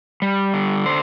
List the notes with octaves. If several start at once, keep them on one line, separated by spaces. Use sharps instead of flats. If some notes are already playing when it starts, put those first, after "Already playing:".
G3
D3
C5